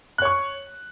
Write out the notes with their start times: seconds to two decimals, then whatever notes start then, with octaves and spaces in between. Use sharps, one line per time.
0.18 F#6
0.22 C#5
0.25 C#6